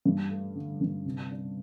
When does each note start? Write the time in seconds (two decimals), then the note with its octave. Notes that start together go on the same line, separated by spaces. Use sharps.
0.05 G2
0.30 A3
0.55 D3
0.81 G2
1.05 C3
1.31 D4